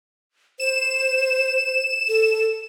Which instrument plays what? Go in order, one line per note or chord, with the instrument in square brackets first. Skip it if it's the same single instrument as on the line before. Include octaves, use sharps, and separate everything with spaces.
[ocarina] C5 [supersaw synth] E7
[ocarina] A4